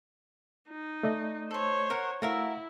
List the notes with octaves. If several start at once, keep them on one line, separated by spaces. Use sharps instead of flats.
D#4
A3 D5 D#5
A4 C5 C#5 C6
A#4 F#5
A3 E4 F#4 A#4 E5 F5